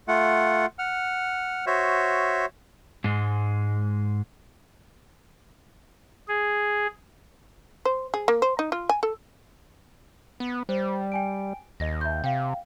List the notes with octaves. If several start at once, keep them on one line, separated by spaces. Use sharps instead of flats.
A3 F4 F#5
F#5 F6
F#4 C5 C#5 E5
G#2 G#3
G#4
C5
G#4
A#3
C5
D#4
F4
G#5
A4
B3
G3 C5
G5 G#5 D7
D#2 D#5 A#6
E5 G6
C3 F5 G5